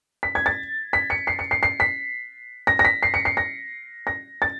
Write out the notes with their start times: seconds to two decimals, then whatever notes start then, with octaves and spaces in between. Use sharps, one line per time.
0.23 B6
0.35 G#6
0.46 A6
0.93 B6
1.10 C#7
1.27 C7
1.39 C#7
1.51 C7
1.63 C7
1.80 B6
2.67 A#6
2.79 A#6
2.85 B6
3.03 C7
3.14 C#7
3.25 C7
3.37 A#6
4.07 A#6
4.42 A6